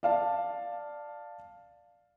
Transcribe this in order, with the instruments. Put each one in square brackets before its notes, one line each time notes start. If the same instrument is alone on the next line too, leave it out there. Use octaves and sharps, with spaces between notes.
[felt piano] D5 F5 A5